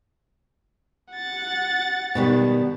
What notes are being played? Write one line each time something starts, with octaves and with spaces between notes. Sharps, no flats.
F#5 A6
B2 D#3 G3